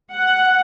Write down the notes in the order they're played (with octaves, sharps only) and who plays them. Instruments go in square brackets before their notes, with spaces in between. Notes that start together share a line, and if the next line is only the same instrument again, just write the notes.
[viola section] F#5